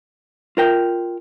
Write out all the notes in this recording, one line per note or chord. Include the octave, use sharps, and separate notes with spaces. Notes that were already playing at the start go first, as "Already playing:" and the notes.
F4 A#4 G5